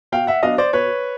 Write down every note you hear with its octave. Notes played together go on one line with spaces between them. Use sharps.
B2 F5 G5
E5 F#5
F#3 B3 D4 D#5 F5
C5 D5
B2 B4 C#5